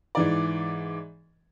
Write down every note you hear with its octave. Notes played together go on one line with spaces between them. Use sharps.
G#2 E3 D5